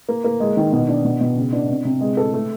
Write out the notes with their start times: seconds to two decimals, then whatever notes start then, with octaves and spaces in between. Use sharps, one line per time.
0.09 A#3
0.24 A#3
0.40 G#3
0.57 D#3
0.73 B2
0.89 D4
1.04 B2
1.21 B2
1.37 C#3
1.53 D4
1.69 C3
1.85 C3
2.01 G#3
2.17 A4
2.34 A3